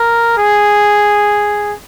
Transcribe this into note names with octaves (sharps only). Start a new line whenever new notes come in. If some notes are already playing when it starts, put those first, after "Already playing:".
Already playing: A#4
G#4